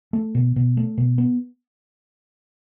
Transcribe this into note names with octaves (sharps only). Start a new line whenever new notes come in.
A3
B2
B2
A3
B2
B3